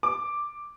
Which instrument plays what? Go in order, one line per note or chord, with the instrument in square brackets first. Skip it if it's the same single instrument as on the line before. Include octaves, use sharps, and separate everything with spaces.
[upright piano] D6